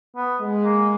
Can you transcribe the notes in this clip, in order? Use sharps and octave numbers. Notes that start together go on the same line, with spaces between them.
B3
G#3
A#3